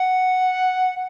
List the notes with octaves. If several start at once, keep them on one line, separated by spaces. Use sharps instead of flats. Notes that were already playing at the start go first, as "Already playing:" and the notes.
Already playing: F#5